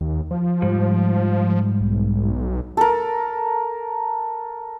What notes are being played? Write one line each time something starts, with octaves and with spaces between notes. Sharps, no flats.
D#2
F3
G#2 G3
B1
A4 A#4